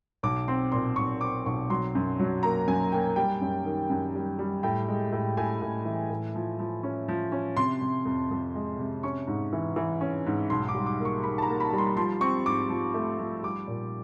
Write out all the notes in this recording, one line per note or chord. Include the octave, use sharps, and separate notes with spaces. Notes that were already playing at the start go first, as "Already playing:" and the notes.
B1 D6
C4 C6
A#2 C6
B1 C#6
C4 D6
B1 C#6
F#3 C6
F#2
F#3
A#3 A#5
F#2 G#5
A#3 G5
G3 G5
F#2
D#3
F#2
G3
G3
A2 G5
G#3
A2
A2 G#5
A2
E3
A2
F3
F3
C#4
F3
C#4
C3 C6
C3
F2
F2
G#3
C3
C#4 C#6
G#2
E3
E3
C#4
G#2
B1 C6
D6
G3
D6
A#3
C#6
A#3 B5
A5
A#5
A#3
B5
G3
C6
F3 C6
C4 C#6
G#2 D6
F3
A3
F3
G3 D6
A#2